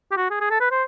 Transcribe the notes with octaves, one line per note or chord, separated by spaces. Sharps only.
G4
F#4
G#4
G#4
A4
B4
C5